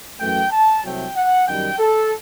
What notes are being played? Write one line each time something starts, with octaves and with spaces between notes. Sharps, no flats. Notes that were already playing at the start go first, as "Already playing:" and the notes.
F#2 E3 A3 G5
A5
C2 C3 F#3 A3 G5
F#5
F#2 D#3 G3 G5
A4